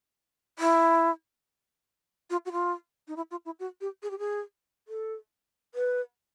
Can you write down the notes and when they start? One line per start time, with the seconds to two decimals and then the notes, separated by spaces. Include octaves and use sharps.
0.59 E4
2.30 F4
2.46 F#4
2.52 F4
3.08 D#4
3.16 E4
3.31 F4
3.45 E4
3.60 F#4
3.81 G4
4.03 G#4
4.11 G4
4.19 G#4
4.88 A4
5.75 B4